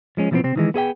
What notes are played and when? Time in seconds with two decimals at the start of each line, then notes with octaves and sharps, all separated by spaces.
0.17 F3 G#3 C#4
0.31 B2 E3 F3 G#3 B3 C4
0.44 C3 C4
0.56 D#3 E3 G#3
0.74 B3 G#4 D#5 G5